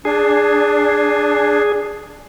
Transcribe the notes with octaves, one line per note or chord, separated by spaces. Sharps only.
D4 G#4